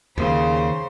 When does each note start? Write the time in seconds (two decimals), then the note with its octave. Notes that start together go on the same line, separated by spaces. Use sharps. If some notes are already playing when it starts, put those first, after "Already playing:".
0.18 D#2 C#3 C5